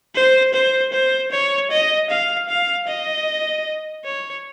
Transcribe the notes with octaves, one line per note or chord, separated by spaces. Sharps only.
C5
C5
C5
C#5
D#5
F5
F5
D#5
C#5